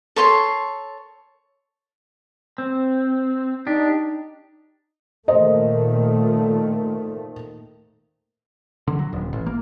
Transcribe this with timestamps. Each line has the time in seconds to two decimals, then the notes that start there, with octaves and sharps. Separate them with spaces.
0.16 A4 C#5 C6
2.58 C4
3.67 D4 D#4 G4
5.28 A#2 D#3 A3 C5 D#5
8.87 D3
8.99 F#3
9.13 D#1
9.33 A1
9.46 A#3